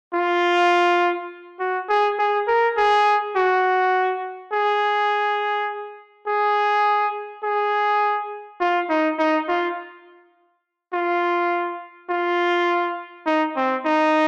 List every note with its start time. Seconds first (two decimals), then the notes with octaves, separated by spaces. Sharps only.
0.13 F4
1.59 F#4
1.89 G#4
2.19 G#4
2.47 A#4
2.77 G#4
3.36 F#4
4.52 G#4
6.27 G#4
7.44 G#4
8.60 F4
8.89 D#4
9.18 D#4
9.48 F4
10.93 F4
12.10 F4
13.26 D#4
13.56 C4
13.85 D#4